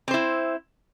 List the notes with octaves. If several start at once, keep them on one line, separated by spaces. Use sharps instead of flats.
C4 E4 C5